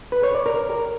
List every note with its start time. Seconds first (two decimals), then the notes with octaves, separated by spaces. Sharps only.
0.12 B4
0.23 C#5
0.35 D5
0.46 A#4